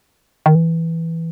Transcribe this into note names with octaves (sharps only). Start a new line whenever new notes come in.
D#3
E3